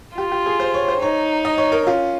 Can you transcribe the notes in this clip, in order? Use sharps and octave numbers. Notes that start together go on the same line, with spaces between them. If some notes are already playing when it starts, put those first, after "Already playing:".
F4 G4
G4
G#4
C5
C#5
C5
D#4 C#5
D#5
C#5
A#4
C#4 F4